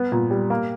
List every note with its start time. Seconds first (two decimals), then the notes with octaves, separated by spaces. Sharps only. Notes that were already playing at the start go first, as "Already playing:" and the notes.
Already playing: B3
0.12 A#2
0.31 G3
0.50 A#3